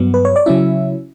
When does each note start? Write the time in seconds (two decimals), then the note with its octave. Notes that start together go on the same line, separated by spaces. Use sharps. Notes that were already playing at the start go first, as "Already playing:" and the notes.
Already playing: G2 F#3 B3
0.14 B4
0.25 C#5
0.36 D5
0.46 C#3 F#3 C#4 E4 E5